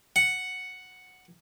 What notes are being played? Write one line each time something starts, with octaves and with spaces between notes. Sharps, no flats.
F#5